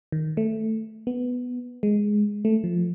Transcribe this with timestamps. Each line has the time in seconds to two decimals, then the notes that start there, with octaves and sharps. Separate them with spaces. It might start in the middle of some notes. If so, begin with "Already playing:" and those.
0.12 D#3
0.37 A3
1.07 B3
1.83 G#3
2.45 A3
2.64 F3